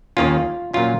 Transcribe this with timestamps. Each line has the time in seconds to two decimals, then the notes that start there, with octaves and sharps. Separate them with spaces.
0.17 D#2 D#3 A#3 C#4 F4
0.74 A#2 F#3 C#4 F4